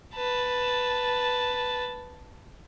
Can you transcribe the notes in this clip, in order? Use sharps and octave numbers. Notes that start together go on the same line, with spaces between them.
B4 A5